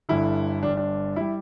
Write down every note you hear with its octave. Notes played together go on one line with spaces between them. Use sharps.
G1 G2 D3 E4
G1 G2 G3 D4
D4
G3 E4